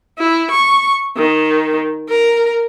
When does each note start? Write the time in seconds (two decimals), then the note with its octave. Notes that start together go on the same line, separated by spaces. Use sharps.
0.19 E4
0.51 C#6
1.16 D#3
2.09 A#4